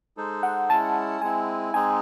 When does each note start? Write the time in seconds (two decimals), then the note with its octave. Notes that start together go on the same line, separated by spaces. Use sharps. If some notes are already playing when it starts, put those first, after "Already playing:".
0.17 G#3 D#4 A4 C5
0.43 F#5
0.70 G#3 C#4 E4 A5
1.21 G#3 C4 E4 G#5
1.74 G#3 C4 D#4 G#5